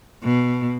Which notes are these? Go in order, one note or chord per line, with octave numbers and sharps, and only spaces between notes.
B2